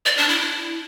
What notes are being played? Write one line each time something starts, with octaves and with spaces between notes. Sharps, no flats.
D5
D4
E4